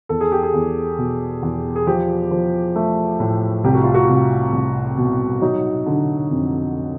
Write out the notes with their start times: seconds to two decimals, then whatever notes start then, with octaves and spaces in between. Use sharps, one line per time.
0.09 E2 A4
0.21 G#4
0.32 G4
0.43 G#4
0.54 E2
0.99 B2
1.43 E2
1.76 G#4
1.87 F3 G4
2.31 F3
2.76 A3
3.20 A2
3.64 C2 G4
3.74 F#4
3.84 F4
3.94 F#4
4.09 C2
4.53 C2
4.97 B2
5.41 F#3 D#4
5.86 D3
6.31 F2